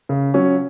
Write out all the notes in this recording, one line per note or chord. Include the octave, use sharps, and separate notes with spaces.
C#3
F#3 C#4